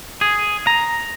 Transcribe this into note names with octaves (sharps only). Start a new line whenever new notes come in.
G#4
A#5